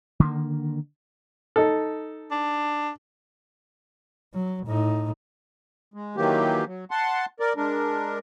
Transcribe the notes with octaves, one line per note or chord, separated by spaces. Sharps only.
D3 D#3 A3 A#3
D#4 A4
D4
F#3
A2 D#4
G#3
D#3 E3 F#3 A#3 G4
F#3
F#5 A5 C6
A#4 D5
G#3 D4 A#4